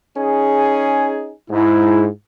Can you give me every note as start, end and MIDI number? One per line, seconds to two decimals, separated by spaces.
0.17 1.32 61
0.17 1.32 63
0.17 1.32 68
1.50 2.06 44
1.50 2.05 64